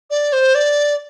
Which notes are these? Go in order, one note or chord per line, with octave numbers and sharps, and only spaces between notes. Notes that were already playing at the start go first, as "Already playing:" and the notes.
D5
C5
D5